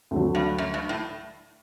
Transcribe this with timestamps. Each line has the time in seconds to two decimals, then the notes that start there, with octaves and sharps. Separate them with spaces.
0.11 D2 D3 F#3
0.35 G2
0.58 F#2
0.74 G2
0.89 A2